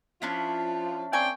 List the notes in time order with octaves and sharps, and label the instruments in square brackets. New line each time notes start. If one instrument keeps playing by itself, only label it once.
[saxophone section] F3 F4 [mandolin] C#4 D4 E4
[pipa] A#3 G#5 C#6 [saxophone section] C4 D5 [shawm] G5